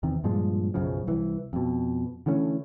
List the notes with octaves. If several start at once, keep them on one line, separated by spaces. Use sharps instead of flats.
E2 C3 D#3
G2 A#2 F3 G#3
B1 F#2 C#3 F3
C2 E3
F2 B2
D3 E3 A3 C#4